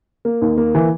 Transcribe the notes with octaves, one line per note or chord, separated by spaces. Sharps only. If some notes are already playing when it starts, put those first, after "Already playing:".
A#3
D#2
A#3
E3